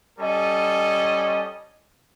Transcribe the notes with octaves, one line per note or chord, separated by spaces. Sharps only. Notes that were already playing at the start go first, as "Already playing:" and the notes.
G3 C#4 A4 D#5